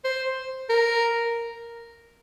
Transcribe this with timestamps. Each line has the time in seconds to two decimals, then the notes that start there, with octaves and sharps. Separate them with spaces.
0.04 C5
0.70 A#4